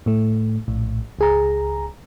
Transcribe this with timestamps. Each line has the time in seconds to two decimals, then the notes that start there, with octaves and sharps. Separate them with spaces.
0.06 A2 A3
0.68 A#1 A2
1.19 C#2 G#4 A#5